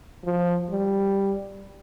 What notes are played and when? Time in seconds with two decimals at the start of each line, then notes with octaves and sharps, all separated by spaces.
0.25 F3
0.70 G3